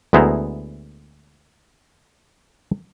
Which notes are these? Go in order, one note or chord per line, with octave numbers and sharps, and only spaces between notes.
D2 G#3 B3 E4 C5 A#5